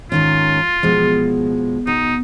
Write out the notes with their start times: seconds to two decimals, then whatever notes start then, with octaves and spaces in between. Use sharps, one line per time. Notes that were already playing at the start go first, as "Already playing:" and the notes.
0.12 G#2 D#3 C#4 F4
0.83 B2 F3 G#3
1.87 B2 D#4